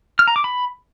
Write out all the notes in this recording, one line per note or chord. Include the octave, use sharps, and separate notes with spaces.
F6
A#5
D6
B5